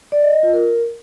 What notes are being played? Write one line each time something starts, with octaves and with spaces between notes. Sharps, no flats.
D5
D#5
D#5
F4
A#4